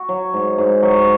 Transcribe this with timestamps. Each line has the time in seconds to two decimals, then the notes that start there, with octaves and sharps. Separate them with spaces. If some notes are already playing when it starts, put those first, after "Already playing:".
Already playing: F#4
0.09 F#3
0.34 G#2
0.58 G#2
0.83 F#3